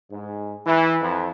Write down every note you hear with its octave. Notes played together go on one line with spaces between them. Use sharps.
G#2
E3
F2